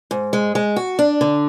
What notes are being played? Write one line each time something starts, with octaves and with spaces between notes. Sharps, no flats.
G#2
G#3
G#3
F#4
D4
D3